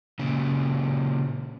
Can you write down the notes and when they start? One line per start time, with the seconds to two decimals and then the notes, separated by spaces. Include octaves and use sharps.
0.19 A#2 C#3